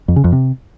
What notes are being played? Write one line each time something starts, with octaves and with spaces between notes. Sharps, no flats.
F2
C#3
F2
C3